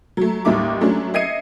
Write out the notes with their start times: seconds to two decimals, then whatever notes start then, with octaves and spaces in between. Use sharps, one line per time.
0.17 F#3 A3
0.45 A1 D#2 G3 D#4 E5 D6
0.81 F#3 A3 C#4 D4
1.14 D#5 E5 G#6 C7 C#7 D#7